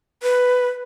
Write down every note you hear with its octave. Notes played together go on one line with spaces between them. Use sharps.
B4